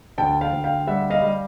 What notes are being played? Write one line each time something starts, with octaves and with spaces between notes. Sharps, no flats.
D2 G5 A5
F5 G5
D2
F5 G5
G3 E5 F#5
D#5 F5
G3